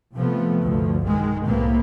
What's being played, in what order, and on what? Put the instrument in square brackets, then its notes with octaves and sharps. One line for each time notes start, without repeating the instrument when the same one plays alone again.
[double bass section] C3 F3 A3 B3
G1 D2 F3
B1 D#3 G#3
C2 A2 C3 A#3 B3